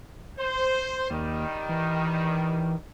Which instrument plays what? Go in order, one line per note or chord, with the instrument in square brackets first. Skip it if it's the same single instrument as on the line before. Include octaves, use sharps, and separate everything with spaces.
[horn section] C5
[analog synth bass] D#2 [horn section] D#3 G3
[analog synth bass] E3